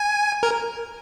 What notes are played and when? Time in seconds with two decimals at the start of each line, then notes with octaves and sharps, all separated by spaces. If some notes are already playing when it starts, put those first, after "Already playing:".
Already playing: G#5
0.43 A#4